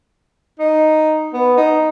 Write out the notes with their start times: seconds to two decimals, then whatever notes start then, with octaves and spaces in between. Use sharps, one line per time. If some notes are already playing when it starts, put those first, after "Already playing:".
0.59 D#4
1.33 B3
1.57 D#4